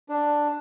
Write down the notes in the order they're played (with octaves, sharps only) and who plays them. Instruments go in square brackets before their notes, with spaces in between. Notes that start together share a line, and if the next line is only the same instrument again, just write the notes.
[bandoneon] D4